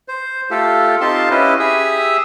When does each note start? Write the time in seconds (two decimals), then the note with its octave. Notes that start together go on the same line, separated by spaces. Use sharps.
0.08 C5
0.51 A3 F4 G4 A4
1.01 C4 D#4 F4 G4 A5 C6
1.31 C#4 E4 G4 B4 D#5
1.60 G4 G#4 E5 D#6 E6